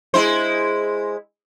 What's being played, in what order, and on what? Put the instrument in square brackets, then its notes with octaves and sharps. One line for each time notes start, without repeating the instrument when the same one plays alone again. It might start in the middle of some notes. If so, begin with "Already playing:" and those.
[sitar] G#3 E4 C5